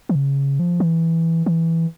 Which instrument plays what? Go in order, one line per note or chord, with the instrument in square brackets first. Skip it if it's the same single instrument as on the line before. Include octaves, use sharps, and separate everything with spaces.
[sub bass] E3
C#3
F3
E3
E3